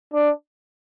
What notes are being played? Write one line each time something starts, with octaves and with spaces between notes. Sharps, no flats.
D4